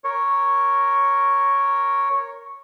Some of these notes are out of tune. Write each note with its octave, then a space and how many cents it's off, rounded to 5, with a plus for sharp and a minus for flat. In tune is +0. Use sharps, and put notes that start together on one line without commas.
A#4 +0 C#5 +0